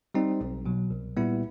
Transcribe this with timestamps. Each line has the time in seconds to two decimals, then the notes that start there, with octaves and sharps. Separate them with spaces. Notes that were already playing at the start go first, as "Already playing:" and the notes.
0.14 G3 C4 D#4
0.41 B1
0.66 B2 F#3
0.91 C2
1.17 A#2 G3 B3 E4